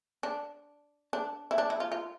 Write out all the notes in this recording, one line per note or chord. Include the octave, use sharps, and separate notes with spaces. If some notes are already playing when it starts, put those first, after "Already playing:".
D4
D4
E4
D4
E4
F4
F4